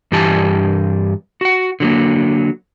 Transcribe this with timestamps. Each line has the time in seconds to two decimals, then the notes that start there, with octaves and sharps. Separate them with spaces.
0.12 G2 E3 G4 G#5 A5
1.41 F#4 F#5
1.80 D3 F#3 A#3